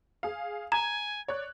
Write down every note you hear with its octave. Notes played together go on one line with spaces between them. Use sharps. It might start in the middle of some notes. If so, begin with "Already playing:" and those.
G#4 F5
G#5 A#5 G#6
C#5 D5 F#6